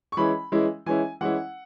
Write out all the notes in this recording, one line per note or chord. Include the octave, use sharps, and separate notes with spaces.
C#6
E3 G#3 C#4 E4 B5
E3 G#3 C#4 E4
E3 G#3 C#4 E4 G#5
E3 G#3 C#4 E4 F#5